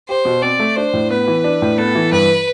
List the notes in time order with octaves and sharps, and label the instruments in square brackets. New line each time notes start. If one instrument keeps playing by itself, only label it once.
[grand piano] G4 [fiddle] C5
[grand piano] B2
[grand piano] C4 [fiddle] D5
[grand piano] A3
[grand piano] D4 [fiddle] C5
[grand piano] A2
[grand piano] B3 [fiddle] B4
[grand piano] E3
D4
A2
[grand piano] B3 [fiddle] A4
[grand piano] E3
[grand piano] G2 [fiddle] B4